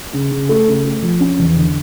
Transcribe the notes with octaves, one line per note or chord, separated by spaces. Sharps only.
C#3
C#3
A3
C#3
A3
F3
C#4
E2
D3